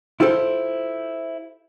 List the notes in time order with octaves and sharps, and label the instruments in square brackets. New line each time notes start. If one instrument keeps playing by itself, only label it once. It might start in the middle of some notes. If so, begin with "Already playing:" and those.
[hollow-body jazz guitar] E4 F4 G4 A4 C5